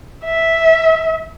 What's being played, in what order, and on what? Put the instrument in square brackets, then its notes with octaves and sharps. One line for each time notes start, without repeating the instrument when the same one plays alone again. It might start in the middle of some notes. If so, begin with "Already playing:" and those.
[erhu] E5